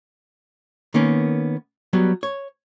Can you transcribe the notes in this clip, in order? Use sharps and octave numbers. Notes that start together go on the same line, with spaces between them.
D#3 A#3 B3 C#4
F#3 G3 B3
C#5